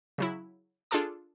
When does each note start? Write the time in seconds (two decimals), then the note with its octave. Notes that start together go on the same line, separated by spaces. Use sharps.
0.18 C#3 F#3 E4
0.91 D4 F4 G#4 A4 A5 D6